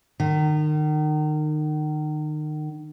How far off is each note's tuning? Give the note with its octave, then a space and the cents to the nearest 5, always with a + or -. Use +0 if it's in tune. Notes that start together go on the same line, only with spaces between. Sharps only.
D#3 -35